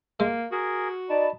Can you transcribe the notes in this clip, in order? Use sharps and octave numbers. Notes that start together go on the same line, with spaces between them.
G#3 A#3
F#4 G#4 A#4
D#4 D5 A5 B5